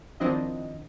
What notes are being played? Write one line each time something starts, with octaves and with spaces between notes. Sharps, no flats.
D#3 F3 C4 D4 E4 D#5